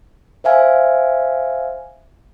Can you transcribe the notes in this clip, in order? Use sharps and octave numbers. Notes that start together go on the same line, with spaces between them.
C5 E5 F5 G#5